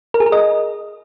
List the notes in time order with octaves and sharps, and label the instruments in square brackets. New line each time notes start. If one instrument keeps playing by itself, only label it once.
[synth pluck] A#4
G#4
A#4
D#5